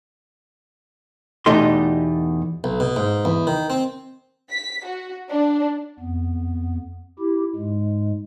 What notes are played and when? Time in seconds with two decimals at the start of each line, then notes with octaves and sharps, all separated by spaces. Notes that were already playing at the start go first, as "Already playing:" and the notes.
1.46 E2 B2 A3 D#4 G4 C6
2.64 B1
2.80 B2
2.96 G#2
3.25 E2
3.47 D#3
3.70 C4
4.50 B6
4.85 F#4
5.30 D4
6.00 F2 B3
7.19 E4 G4
7.56 G#2 G#3